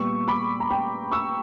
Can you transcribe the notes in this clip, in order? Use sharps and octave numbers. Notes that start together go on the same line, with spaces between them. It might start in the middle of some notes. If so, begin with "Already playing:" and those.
Already playing: A#2 G3 B3 C#6 E6
B5 D6
A#5
G5 B5
C#6 E6